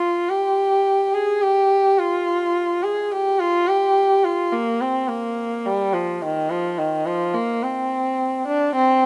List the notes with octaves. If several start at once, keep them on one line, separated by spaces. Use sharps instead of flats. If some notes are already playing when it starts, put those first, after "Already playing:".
Already playing: F4
G4
G#4
G4
F4
G#4
G4
F4
G4
F4
A#3
C4
A#3
G3
F3
D#3
F3
D#3
F3
A#3
C4
D4
C4